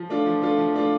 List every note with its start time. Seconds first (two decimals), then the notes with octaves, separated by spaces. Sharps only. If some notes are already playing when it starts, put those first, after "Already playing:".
Already playing: F3
0.10 A3 D4 F4
0.26 F3
0.42 A3 D4 F4
0.58 F3
0.74 A3 D4 F4